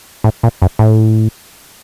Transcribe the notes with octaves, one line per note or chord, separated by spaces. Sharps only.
A2
A#2
F#2
A2